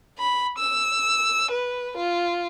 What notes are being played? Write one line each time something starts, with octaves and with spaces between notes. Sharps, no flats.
B5
E6
B4
F4